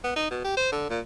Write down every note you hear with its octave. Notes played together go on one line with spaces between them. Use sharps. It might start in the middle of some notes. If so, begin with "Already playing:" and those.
B3
D#4
B2
G4
C5
D3
A#2